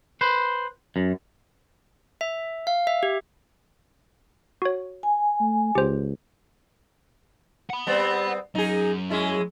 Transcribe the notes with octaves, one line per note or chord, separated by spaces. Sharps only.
B4 C5
F#2
E5
F5
E5
G4
F#4 C#5
G#5
A3
C#2 G4 C5
F#5 B5
G3 B3 C4
F#2 F#3 D#4 G#4
G#3 C#4 E4